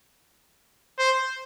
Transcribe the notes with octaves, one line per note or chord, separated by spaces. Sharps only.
C5